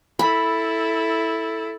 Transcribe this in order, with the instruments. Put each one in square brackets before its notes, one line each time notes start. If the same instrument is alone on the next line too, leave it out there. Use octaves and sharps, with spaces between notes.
[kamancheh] E4 A4 [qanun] B5